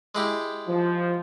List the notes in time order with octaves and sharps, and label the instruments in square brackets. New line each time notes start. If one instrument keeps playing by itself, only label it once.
[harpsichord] G#3 E4 G4
[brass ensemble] F3